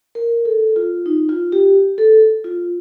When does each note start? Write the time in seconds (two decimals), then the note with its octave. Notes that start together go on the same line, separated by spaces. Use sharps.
0.15 A#4
0.45 A4
0.76 F4
1.06 D#4
1.29 F4
1.52 G4
1.98 A4
2.44 F4